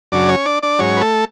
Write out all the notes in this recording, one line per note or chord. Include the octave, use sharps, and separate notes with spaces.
F#2 C#3 F#3 D4 D5
C#4 C#5
D4 D5
D4 D5
G#2 F#3 C#4 C#5
B4
A3 A4